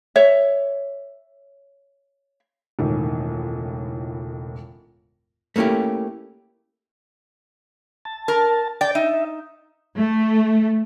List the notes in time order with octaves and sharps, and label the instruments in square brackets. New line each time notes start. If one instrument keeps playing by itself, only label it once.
[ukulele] C#5 E5
[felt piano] E1 C#2 A2 D#3
[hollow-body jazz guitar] A3 A#3 C#4 E4 G4
[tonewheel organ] A5
[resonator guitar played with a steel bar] A#4
[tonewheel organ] D5 A6 [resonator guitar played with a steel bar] G5
[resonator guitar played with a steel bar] D#4 [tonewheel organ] E5
[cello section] A3